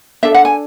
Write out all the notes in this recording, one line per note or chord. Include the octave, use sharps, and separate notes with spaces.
D4 A4 E5
F#5
G#5